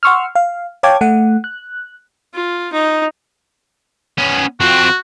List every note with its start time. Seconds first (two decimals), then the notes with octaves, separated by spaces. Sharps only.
0.03 F#5 C6 C#6 E6 F6
0.35 F5
0.83 C#5 F5 G5 A5 D6 G#6
1.01 A3 F#5
1.44 F#6
2.34 F4
2.73 D#4
4.18 B3 C#4
4.60 F2 C4 F#4